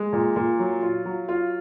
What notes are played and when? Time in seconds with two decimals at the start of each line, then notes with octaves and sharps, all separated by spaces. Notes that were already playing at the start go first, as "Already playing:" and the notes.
Already playing: G#3
0.13 A#2
0.36 A#2
0.59 F#3
0.82 F4
1.05 F#3
1.29 F4